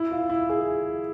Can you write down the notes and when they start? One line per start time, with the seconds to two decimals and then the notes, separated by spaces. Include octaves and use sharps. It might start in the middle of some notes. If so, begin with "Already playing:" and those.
Already playing: E4
0.11 F4
0.29 E4
0.49 G#4